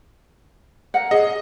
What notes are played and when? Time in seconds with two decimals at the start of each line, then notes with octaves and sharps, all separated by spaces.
0.94 A#4 F#5
1.11 G#4 D#5